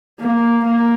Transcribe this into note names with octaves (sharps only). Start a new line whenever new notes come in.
A#3
A#3